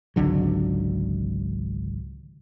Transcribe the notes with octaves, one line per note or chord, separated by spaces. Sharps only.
G#1 C#2 D3 F#3